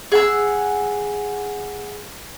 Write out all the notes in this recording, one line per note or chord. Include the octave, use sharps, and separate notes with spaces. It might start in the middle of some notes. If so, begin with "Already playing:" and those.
G#4 F#5 E6